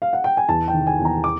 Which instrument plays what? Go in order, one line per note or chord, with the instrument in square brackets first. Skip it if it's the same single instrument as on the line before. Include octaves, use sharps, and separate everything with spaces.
[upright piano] F5
F#5
G5
G#5
E2 A5
G5
D#3
G#5
E2
A#5
D6